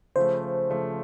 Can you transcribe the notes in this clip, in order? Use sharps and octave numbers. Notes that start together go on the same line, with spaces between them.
C#3 F3 A3 C5
C#3 F3 A3